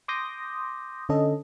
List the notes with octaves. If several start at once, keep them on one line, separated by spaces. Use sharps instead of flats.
C6 D6 D#6 G6 A#6
D3 C#4 A4 D#5